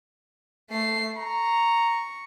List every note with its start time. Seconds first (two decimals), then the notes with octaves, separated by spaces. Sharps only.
0.70 A3 C7
1.18 A#5 C#6